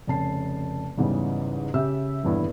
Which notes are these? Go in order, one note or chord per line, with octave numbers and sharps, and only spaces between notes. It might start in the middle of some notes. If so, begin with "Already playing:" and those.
F1 C#3 A5 C7
E2 G#2 C#3 E3 G3
C#3 G4 E5 E6
D#1 E2 G2 E4